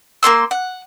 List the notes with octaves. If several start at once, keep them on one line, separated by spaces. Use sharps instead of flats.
A#3 G#4 C6 E6
F#5